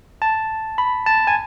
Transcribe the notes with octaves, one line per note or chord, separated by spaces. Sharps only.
A5
B5
A5
G#5